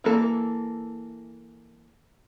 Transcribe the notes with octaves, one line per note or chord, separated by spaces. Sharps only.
E3 A#3 A4